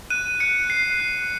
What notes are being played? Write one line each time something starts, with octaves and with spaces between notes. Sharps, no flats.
F#6 D#7
F#6 C#7
F#6 C7
F#6